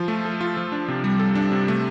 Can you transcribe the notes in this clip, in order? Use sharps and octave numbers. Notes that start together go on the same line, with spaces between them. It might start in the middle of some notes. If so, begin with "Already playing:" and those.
Already playing: F3 F4
A3
A4
F4
F3
D4
C3
G3
A4
D4
C3
A3